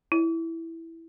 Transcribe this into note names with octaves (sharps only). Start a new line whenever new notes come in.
E4